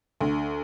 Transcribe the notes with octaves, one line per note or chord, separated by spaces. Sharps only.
D2